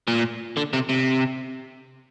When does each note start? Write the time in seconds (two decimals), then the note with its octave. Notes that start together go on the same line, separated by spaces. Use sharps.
0.08 A#2
0.57 D3
0.73 C3
0.89 C3